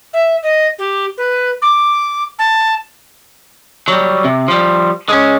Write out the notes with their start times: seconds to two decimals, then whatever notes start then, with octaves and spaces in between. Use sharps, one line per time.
0.13 E5
0.43 D#5
0.79 G4
1.18 B4
1.62 D6
2.39 A5
3.88 F#3 G3
4.24 C3
4.48 F3 G3
5.09 G#3 C#4